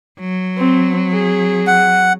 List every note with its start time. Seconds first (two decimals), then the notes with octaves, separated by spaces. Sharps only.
0.19 F#3
0.57 C4
1.13 G#4
1.67 F#5